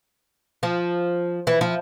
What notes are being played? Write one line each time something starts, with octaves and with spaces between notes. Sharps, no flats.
F3
E3
F3